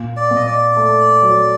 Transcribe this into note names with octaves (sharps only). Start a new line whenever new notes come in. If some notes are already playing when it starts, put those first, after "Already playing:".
Already playing: A#2
D5
A#2 D#5
D5
A3
F#3